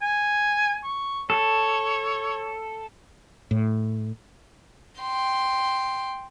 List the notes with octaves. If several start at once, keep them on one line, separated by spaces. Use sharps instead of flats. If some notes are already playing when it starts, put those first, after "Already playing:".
G#5
C#6
A4 C#5
A2
G5 C6